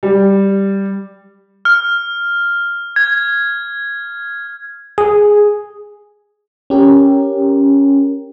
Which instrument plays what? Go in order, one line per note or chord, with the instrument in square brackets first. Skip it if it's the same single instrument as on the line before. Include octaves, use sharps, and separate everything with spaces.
[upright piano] G3
[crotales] F6
G#6
[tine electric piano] G#4
[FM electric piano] C#4 G4 A#4